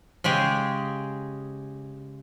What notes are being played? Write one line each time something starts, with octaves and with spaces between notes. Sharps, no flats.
C#3 G#3 G4 G#4